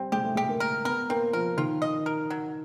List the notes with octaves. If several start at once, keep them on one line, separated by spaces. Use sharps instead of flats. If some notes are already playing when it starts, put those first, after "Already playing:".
Already playing: G3 C4
G#3 G4
A3
G#3 G4
A#3
A#4
B3 A#4
A#3 C4
F3 A#4
D#3 F4
D#5
A#4
F#3